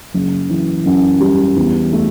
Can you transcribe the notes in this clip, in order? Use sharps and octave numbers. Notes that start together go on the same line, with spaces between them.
F#1
E3
F#2
G3
E2
A3